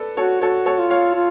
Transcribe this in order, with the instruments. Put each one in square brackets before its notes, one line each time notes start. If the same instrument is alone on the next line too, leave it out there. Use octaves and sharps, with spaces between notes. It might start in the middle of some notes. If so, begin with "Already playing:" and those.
Already playing: [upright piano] A4 B4 D5
[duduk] F#4 [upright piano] A4 C#5
[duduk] F#4 [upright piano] A4 C#5
[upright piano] A4 C#5
[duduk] F4
[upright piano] C#5 F5
[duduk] F4